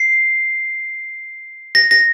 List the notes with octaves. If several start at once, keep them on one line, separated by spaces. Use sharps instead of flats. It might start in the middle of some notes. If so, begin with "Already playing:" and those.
Already playing: C7
A#6
A#6